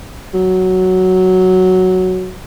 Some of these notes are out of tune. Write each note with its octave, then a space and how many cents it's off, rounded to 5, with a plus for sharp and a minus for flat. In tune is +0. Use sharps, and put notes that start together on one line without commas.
F#3 +5